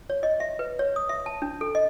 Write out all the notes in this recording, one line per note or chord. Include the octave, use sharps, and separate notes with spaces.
C#5
D#5
E5
B4
C#5
D#6
E5
A5
D4
A4
D#5